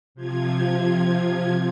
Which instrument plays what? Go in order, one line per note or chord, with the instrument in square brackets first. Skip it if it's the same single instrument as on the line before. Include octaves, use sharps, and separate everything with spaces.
[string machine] C3 F3 F4 G#6